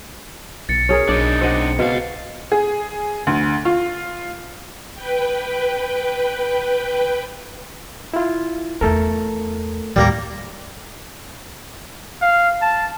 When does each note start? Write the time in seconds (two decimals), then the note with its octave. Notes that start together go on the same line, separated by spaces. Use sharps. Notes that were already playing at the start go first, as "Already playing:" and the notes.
0.69 B1 A6 C#7
0.89 C#4 G#4 A#4
1.09 B1 D4 D#4 D5
1.41 C4 D#5 F#5
1.79 C#2 B2 F5
2.52 G#4
3.27 D2
3.65 F4
4.95 B4 G5
8.14 E4 F4
8.81 E2 A3 D#4 A4 A#4
9.96 D#2 A2 G3 A#3 A#4
12.22 F5
12.62 A5